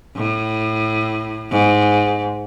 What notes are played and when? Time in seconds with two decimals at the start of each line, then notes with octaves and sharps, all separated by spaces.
0.16 A2
1.50 G#2